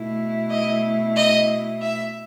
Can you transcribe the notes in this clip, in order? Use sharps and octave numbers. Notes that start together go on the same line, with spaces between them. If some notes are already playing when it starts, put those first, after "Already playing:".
Already playing: B2 A3 E4
D#5
D#5
E5